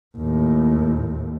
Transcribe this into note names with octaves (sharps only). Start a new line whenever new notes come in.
D#2 A2